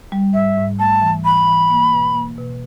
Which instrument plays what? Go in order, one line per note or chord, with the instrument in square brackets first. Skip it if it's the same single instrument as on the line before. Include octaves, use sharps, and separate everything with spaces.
[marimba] G3
[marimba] G#2 [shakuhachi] E5
[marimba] G#2
[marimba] A3 [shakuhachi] A5
[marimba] E3
[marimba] E3 [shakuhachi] B5
[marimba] E3
A#3
B2
A#3
B2